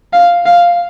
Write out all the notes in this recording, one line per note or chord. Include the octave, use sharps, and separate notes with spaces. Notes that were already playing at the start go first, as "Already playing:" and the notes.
F5
F5